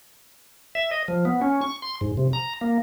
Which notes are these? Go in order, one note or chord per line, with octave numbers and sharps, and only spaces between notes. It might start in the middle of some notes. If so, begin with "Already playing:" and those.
E5
D#5
F3
B3
C#4
C#6
C6
G#2
C3
A#5
A#3